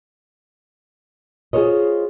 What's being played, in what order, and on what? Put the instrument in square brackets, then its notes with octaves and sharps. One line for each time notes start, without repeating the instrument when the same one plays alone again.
[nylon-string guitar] F4 G#4 A#4 C5 C#5 D#5